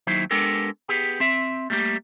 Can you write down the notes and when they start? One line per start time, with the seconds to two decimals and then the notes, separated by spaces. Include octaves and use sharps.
0.07 D#2 F#3 D#4 E4 C5
0.31 G#3 B3 D4 G4 A4 A#4
0.89 B3 G4 G#4
1.20 C4 E5
1.70 G3 A3 A#3 E4 G4